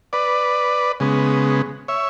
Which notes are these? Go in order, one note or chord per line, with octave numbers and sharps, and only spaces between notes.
B4 D5
C#3 G#3 B3
C#5 E5